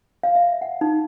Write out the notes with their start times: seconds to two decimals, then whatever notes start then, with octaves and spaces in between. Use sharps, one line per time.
0.23 F5
0.35 E5
0.61 F#5
0.81 D#4